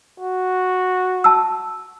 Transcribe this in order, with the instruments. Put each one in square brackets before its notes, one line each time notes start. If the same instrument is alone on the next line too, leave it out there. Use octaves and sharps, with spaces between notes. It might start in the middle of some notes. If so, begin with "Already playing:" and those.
[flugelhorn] F#4
[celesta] A5 E6